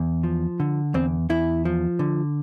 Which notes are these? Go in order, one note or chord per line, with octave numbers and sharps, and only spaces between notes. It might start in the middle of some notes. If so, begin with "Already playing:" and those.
Already playing: E2
F3
D3
E2 C4
E2 E4
F3
D3